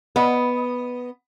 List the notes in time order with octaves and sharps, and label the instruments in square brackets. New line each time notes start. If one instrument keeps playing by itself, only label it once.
[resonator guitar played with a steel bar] B3 D#5